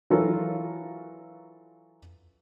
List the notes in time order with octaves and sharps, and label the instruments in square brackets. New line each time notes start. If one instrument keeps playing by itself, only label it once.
[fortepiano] E3 F#3 F4 A4 A#4